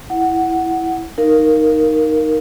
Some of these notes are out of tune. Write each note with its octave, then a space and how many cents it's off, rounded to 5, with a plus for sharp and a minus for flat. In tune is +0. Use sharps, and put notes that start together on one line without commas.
E4 +0 F#5 +5
D#4 +0 A#4 +0 F5 +0